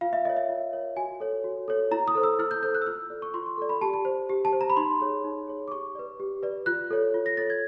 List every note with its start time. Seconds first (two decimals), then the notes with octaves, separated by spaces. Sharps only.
0.01 F4 F5
0.13 E5
0.25 A#4 C#5 D#5
0.37 E5
0.49 F4
0.73 A#4 C#5
0.96 F#4 G#5
1.20 A4 C#5
1.44 F#4
1.68 A4 C#5
1.91 E4 A#5
2.08 D#6
2.15 A4 C5
2.23 E6
2.39 E4 F6
2.51 G6
2.63 A4 C5 G6
2.74 F#6
2.82 E6
2.86 F4 F6
3.10 A4 D5
3.22 C#6
3.34 F4 C6
3.46 C#6
3.58 A4 D5
3.69 B5
3.81 G4 A5
3.94 A5
4.05 C5
4.29 G4
4.45 A5
4.53 C5
4.61 A#5
4.70 B5
4.77 D#4 C6
5.00 G#4 C#5
5.24 D#4
5.48 G#4 C#5
5.68 D6
5.72 G4 C#6
5.95 B4 D5
6.20 G4
6.43 B4 D5
6.66 F4 F#6
6.91 A4 C#5
7.14 F4
7.26 A#6
7.37 A4 C#5 A6
7.50 G#6